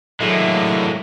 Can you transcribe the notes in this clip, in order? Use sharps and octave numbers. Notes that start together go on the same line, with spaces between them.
A2 D3 E3 F#3 G#3 A#3 E5